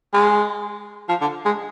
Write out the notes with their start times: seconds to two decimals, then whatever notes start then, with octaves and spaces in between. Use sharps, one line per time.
0.14 G#3
1.09 F3
1.21 D3
1.45 G#3